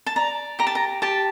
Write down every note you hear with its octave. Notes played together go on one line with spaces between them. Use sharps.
A5
D5 A#5
G4 A#5
A5
A#5
G4 A5